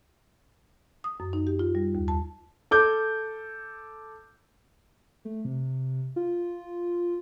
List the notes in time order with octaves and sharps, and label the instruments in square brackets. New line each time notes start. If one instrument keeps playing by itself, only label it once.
[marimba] D#6
F#2
D#4
G4
F4
G3
D#2
A5
[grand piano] A4 D6 G6
[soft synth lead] A3
C3
F4